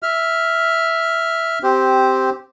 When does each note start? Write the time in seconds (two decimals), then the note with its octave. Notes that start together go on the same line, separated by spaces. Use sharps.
0.03 E5 F6
1.63 C4 G4 C5